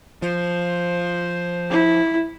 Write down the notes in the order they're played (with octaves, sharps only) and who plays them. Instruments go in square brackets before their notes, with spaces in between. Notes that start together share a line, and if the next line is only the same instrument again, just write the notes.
[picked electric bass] F3 [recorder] C5
[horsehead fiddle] E4